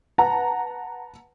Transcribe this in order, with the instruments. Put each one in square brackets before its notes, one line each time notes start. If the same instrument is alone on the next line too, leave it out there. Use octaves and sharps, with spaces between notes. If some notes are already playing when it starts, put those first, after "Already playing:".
[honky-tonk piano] B4 F#5 A5 A#5